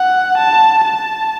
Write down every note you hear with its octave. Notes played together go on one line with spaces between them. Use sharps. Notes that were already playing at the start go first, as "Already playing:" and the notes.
Already playing: F#5
A5
A5